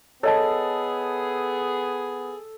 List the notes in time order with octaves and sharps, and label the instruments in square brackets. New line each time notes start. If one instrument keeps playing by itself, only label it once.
[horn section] B3 G#4 [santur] A4 [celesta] C#5 D#5 A5